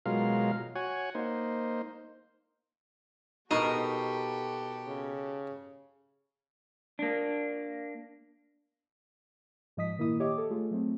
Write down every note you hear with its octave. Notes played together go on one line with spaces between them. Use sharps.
B2 F#3 G#3 F4 A#4 F5
F#4 C#5 F#5 G#5
A#3 D#4 C5
B2 D#4 F#4 G4 A4 A#4
C#3
A#3 D4
G#2 F3 D#5 D#6 B6
A#2 D#3 A#3 E4 D#6
G4 C#5 D#5 E5 D6
A4
A3 F4 G#4
F#3 A3 C4